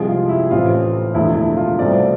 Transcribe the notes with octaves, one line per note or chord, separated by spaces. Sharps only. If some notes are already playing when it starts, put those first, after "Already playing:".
Already playing: C2 C3 F3 G#3 G#4
F4
E4
A1 A2 E3 A3 C4 F4
E1 E2 D3 F3 A3 E4
E4
F4
C2 B2 A3 C4 D5